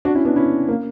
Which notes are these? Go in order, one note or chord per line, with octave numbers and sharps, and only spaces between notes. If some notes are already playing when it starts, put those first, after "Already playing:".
D4 F#4
C#4 E4
B3 D4
C#4 E4
A#3 C#4